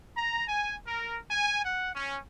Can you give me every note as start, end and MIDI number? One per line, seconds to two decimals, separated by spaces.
0.15 0.45 82
0.46 0.72 80
0.86 1.16 70
1.29 1.62 80
1.64 1.93 78
1.93 2.16 61